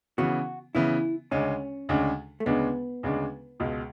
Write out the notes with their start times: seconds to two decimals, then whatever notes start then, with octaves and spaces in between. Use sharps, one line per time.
0.18 C#3 E3 B3 F#4
0.75 C#3 E3 B3 E4
1.31 D2 C#3 G#3 C#4 D4
1.89 D2 C#3 G#3 D4
2.40 A3
2.46 D2 C#3 G#3 B3 D4
3.03 D2 C#3 G#3 D4
3.60 C#2 B2 G#3